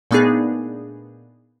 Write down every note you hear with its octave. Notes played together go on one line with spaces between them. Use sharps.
A#2 A3 B3 D4 D#4 G#4